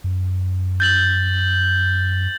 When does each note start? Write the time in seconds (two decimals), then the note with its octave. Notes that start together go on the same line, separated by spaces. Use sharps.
0.04 F#2
0.80 G6 A6 F#7